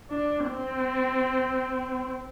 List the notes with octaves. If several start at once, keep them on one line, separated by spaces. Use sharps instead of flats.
D4
C4